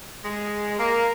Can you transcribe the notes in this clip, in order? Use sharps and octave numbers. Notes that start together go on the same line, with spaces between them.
G#3
A#3